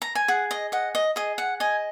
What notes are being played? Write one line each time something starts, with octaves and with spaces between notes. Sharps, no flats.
A#5
G#5
G#4 F#5
D#5
D#5 F#5
D#5
G#4 D#5
F#5
D#5 G#5